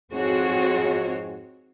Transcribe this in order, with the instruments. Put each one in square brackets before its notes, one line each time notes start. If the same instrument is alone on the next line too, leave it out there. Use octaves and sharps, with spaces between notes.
[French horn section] F2 G#2 G#4 [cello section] C4 F#4 C#5